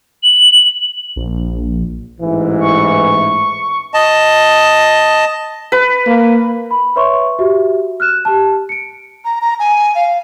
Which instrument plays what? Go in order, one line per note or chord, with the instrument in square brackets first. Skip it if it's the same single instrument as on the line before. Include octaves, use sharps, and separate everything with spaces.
[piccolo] F#7
[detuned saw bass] A#1
[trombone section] A1 G#2 E3
[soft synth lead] C#6
[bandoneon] D#5 A5
[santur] B4
[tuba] A#3
[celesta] B5
B4 C#5 E5 C6 C#6
F#4 G4 E5
F6 F#6 E7
G4 A5
C#7 D7
[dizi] A#5
A#5
G#5
F5